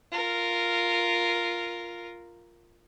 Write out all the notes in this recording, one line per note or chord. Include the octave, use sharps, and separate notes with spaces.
F4 A#4